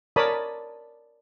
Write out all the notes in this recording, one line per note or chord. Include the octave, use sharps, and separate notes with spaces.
A#4 C#5 D5 A5 B5 D#6